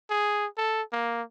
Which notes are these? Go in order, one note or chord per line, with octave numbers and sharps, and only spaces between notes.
G#4
A4
A#3